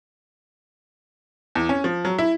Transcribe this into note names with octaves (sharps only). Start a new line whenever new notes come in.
E2
C#4
F3
F#3
E4